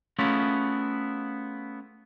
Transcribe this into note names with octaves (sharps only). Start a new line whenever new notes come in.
A3 B3 C#4 E4 F4 G#4